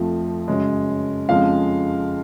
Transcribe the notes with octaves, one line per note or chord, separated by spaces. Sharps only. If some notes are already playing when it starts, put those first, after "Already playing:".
Already playing: F2 F3 A3
F#2 C#3 G#3
F2 C#3 F3 G#3 F5